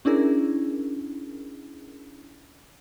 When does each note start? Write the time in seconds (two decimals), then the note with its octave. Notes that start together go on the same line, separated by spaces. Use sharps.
0.05 C#4 D4 E4 G#4 A#4